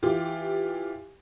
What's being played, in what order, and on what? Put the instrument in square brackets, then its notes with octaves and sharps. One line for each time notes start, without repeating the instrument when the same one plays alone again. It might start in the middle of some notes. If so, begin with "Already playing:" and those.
[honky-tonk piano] E3 F4 G4